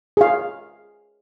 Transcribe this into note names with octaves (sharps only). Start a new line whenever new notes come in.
G#4 F5